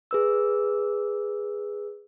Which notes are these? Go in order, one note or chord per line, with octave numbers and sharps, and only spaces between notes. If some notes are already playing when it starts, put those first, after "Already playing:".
G#4 B4 E6